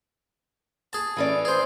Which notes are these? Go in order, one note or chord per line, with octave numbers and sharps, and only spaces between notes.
G#4 A5
E3 C#4 D5
G#4 C5